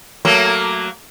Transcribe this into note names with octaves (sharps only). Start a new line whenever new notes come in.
F#3 A3 A#3